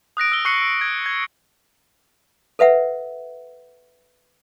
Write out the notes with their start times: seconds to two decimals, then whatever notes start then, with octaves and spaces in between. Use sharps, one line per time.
0.17 D#6 F#6 A#6 D7
0.32 E6 G7
0.45 C#6 D#6 F#6 C7 C#7 F#7
0.62 E6
0.81 G#6
1.06 G#6
2.59 A4 B4 E5 F#5